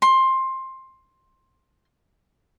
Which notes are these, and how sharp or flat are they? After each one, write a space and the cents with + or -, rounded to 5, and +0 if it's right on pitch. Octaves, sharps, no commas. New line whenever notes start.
C6 +15